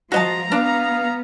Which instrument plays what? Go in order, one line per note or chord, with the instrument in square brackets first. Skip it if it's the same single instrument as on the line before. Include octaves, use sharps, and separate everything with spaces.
[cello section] F3 [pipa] F#4 D#5 A5 [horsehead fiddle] A#5
[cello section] B3 [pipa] D4 [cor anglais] F5